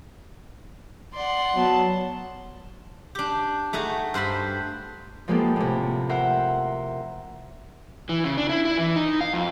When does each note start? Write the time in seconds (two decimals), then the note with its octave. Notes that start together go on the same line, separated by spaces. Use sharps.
1.14 D5 F#5 C6
1.55 F#3 B3 A5
3.15 D4 G4
3.73 A3 D#4 F#4 G#4
4.14 G2 C5 A5 B5
5.28 F3 G#3 A#3 B3 G4 A4
5.56 A2 C3
6.09 A#4 C5 E5 F#5
8.09 E3
8.24 C#3
8.37 D4
8.49 E4
8.65 E4
8.78 E3
8.96 D#4
9.21 F5
9.33 F2